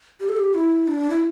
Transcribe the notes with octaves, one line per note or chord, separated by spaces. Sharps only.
G4
A4
G4
E4
D4
E4